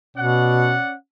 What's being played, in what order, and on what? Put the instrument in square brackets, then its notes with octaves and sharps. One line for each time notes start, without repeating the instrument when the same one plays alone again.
[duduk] B2 [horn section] C#4 D5 F#5